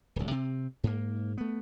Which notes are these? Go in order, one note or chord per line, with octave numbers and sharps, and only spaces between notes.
D1 C2
C3 C4
G#2 A#3
A3 B3